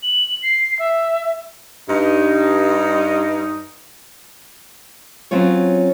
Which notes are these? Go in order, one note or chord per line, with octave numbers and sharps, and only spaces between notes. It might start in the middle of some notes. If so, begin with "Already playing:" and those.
F#7
C7
E5
G2 D#4
F#3 C4 C#4 F4 C#5